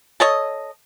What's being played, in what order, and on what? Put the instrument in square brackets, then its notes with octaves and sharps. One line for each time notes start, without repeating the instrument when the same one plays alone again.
[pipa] A4 C#5 D#5